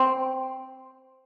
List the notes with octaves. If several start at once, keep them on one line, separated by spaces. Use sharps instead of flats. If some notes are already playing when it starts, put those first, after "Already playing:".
Already playing: C4